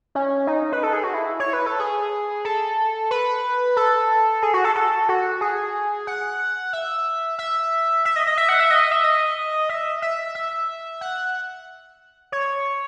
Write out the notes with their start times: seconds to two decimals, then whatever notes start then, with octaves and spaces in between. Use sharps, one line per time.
0.15 C#4
0.47 D#4
0.73 B4
0.83 A4
0.93 G#4
1.03 F#4
1.14 E4
1.40 C#5
1.53 B4
1.66 A4
1.79 G#4
2.45 A4
3.11 B4
3.77 A4
4.42 G#4
4.54 F#4
4.64 A4
4.75 A4
5.09 F#4
5.41 G#4
6.07 F#5
6.73 E5
7.39 E5
8.05 E5
8.16 D#5
8.27 D#5
8.38 E5
8.49 F#5
8.60 E5
8.70 D#5
8.92 E5
9.03 D#5
9.69 E5
10.02 E5
10.35 E5
11.01 F#5
12.32 C#5